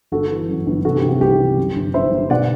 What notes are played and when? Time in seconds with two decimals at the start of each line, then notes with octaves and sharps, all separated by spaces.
0.12 G1 F#4 A4
0.30 E3
0.49 F#2
0.66 G1
0.85 C3 F#4 A4
0.97 G4
1.03 C3
1.09 F#4
1.21 C2 G4
1.40 C3
1.57 F#2
1.76 G1
1.94 G1 C5 E5
2.12 G1
2.30 B2 D5 F#5